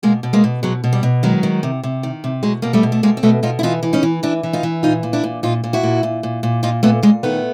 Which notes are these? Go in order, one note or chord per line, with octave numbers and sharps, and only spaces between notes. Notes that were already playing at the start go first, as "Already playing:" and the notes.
B2 G#3 A#3
B2
G#3 A#3
B2
B2 F#3 G#3
B2
G3
B2
D#3 F#3 G#3
D#3
C3
C3
D#3
C3
B2 F#3 G#3
B2 A#3
G3 A3
B2
A3
B2 G#3 A#3
C4
B2 A3 B3
B2 D#4 F4
E4
E3 D#4 F4
E3
C#4 D#4
E3
E3 D4 E4
E3
D#4 F4
E3
A#2 D#4 F4
A#2
D4 E4
A#2
A#2 D#4 F4
A#2
E4 F#4
A#2
A#2
A#2
A#2
A#2 D#4 F4
A#2 A3 B3
A#2 G#3 A#3
D#3 A3 B3